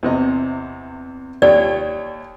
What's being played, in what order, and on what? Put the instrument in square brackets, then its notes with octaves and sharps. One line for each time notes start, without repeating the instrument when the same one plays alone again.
[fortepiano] E2 C3 D#5
[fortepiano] D#2 C#5 G5 [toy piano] D5